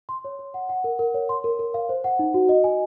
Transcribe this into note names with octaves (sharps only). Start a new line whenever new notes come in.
C6
C#5
C#5
F#5
F#5
A#4
A#4
C#5
C6
A#4
A#4
F5
C5
F#5
D#4
F#4
D#5
G#5